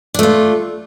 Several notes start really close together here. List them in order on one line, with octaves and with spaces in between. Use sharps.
D4 A3 F4